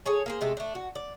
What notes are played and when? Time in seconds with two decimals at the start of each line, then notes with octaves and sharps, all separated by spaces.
0.06 G#4 A4 C#5 G#5
0.26 A#3 G#4 C5
0.41 C3 G#3 A3 A4
0.57 A3 D4
0.75 F#4
0.95 D5